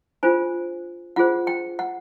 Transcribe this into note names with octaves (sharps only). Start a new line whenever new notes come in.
D4 F4 G#4 C5 G#5
D4 F4 G#4 C5 F#5
G5
F#5